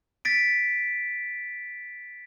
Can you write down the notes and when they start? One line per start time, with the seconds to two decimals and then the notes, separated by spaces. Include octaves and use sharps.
0.25 A6 B6 D7